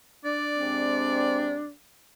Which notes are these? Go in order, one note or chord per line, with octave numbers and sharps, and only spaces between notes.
D4 D5
C3 G#3 C4